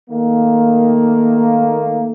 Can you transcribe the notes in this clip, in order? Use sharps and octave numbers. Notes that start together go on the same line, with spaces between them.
D#3 A3 A#3